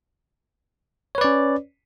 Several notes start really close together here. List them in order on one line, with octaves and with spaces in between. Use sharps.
C#5 B4 D5 C#4